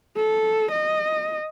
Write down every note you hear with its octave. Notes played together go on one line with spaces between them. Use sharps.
A4
D#5